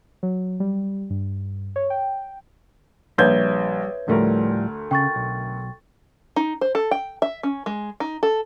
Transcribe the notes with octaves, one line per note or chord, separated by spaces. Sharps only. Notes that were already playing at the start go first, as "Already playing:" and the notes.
F#3
G3
G2
C#5
G5
A#1 G3 B4 C#5 E5 G6 G#6
D2 A2 F3 G3 A3 A#4
C#3 G5 C#6 A6
B1
D#4
C5
A4
G5
E5
C#4
G#3
D#4
A4